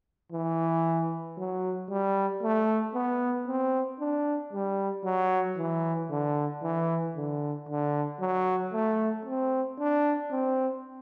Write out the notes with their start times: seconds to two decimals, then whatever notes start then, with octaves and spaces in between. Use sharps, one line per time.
0.32 E3
1.38 F#3
1.90 G3
2.42 A3
2.94 B3
3.47 C4
4.00 D4
4.53 G3
5.05 F#3
5.57 E3
6.10 D3
6.63 E3
7.16 D3
7.69 D3
8.20 F#3
8.73 A3
9.25 C4
9.79 D4
10.31 C4